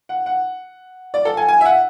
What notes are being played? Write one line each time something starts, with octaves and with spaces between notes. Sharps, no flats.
F#5
F#5
D5
A4
G#5
G#5
E5
F#5